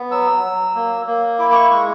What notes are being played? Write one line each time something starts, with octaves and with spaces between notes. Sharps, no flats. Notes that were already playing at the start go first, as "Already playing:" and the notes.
Already playing: B3
F#3 E6
F#3
A#3
A#3
E4 D6
D6
C#6
G#3 C#6